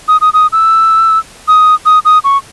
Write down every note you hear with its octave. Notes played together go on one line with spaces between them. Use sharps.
D#6
D#6
D#6
E6
D#6
D#6
D#6
C#6